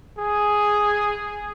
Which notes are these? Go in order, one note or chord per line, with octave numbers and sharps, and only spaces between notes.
G#4